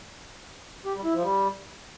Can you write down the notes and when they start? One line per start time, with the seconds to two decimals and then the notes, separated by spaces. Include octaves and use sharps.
0.85 G4
0.95 G3
1.04 E4
1.14 F3
1.23 G3